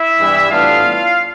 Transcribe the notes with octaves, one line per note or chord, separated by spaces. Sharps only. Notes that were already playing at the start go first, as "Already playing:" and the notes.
Already playing: E4 E5
G2 E3 G3 B3
A2 E3 G3 B3 D4 F4 F5